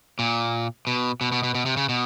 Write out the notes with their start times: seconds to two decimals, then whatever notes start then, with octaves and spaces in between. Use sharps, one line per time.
0.19 A#2
0.87 B2
1.21 B2
1.32 B2
1.43 B2
1.55 B2
1.66 C3
1.77 C#3
1.89 B2